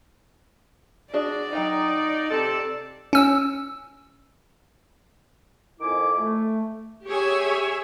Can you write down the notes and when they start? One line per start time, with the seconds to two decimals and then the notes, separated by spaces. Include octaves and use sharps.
1.13 D4 F#4 G#4 D5
1.53 F#3 D#4 G5 A#5
2.30 C3 A4
3.13 C#4 E6
5.81 F2 D#3 E4 G#5 D6
6.18 A3
7.06 G4 G#4 C#5 E5 G#5